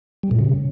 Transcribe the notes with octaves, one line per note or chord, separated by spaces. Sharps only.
G3
A#2
C#3